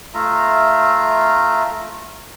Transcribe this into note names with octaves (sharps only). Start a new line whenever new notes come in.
A3 F4 E5 A#5